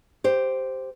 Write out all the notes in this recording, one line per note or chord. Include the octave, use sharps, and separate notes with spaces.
G4 C5